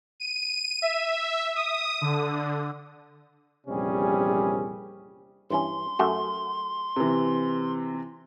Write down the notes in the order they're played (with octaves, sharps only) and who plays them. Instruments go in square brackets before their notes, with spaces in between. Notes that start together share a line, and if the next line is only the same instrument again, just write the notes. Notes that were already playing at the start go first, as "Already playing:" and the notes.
[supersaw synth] D#7
E5
D#6
D3
[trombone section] A#1 E2 C3 G3 C#4 G#4
[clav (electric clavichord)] G2 E3 C#4 [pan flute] C6
[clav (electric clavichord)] F#2 A3 F#4
[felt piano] C3 E3